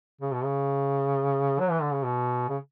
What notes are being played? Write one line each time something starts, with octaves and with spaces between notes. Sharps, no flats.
C#3
B2
C#3
F#3
E3
D3
C#3
B2
C#3